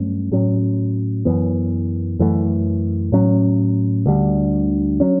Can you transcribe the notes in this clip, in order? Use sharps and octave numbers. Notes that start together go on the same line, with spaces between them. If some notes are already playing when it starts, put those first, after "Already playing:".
Already playing: G2 F#3 A3 C#4
A2 F#3 C#4
F#2 E3 B3
F#2 E3 A3
A2 F#3 C#4
D2 D3 G3
F#3 C#4